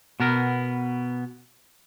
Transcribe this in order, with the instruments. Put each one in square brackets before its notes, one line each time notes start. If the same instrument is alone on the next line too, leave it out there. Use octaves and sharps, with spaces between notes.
[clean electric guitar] B2 B3 A#4